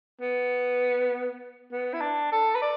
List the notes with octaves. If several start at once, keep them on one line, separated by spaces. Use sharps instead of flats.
B3
B3
E4
D4
A4
B4
D5